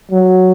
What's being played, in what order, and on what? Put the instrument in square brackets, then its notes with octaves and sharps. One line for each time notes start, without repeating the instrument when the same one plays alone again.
[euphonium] F#3